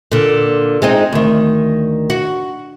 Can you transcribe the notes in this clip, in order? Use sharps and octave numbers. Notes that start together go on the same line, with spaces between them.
A#2 D3
G#3 C4 D#4
D2 D#3
F#4